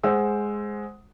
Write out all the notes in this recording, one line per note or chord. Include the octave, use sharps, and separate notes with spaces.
G#3 C5 F#5 E6